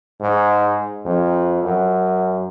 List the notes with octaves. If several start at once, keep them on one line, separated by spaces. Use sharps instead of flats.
G#2
F2
F#2